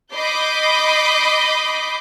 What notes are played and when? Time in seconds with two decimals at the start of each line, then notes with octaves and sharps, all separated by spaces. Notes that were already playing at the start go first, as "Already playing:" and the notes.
0.14 D#5 B5 D6 G6 C7